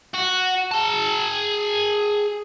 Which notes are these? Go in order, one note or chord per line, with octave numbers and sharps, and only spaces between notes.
F#4
G#4 A5